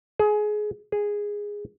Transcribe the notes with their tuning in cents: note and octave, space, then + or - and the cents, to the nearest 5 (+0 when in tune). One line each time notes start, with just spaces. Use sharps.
G#4 +20
G#4 -10